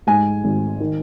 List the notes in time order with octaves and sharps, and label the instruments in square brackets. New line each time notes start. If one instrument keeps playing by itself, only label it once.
[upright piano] G#2 G#5
G#1
D#3